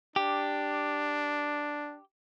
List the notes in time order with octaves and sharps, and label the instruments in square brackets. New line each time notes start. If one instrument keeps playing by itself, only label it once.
[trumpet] D4 [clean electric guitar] G4